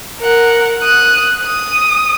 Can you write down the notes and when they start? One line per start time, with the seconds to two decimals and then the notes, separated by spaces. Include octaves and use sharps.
0.20 A#4 F#5
0.81 D#6 F#6
1.44 D#6